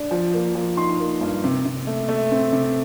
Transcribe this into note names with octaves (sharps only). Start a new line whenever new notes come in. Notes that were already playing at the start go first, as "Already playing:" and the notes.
Already playing: D4
F3
A#3
F3
D#4 C6
A#3
G2
C3
C3
A3
A3
C4
C3